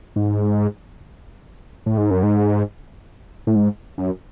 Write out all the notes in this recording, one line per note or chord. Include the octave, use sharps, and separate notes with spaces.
G#2
A2
G#2
F#2
G#2
A2
G#2
F#2